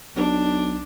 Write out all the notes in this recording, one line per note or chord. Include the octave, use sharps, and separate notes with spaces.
B1 D4